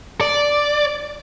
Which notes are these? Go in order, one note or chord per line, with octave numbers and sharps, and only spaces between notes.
D5